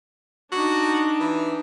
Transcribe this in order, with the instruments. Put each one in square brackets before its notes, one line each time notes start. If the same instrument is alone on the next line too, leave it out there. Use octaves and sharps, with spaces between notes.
[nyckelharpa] D4 D#4 [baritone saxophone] F#4
[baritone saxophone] E3